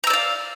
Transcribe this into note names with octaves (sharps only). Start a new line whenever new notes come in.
D5 F5 A#5 E6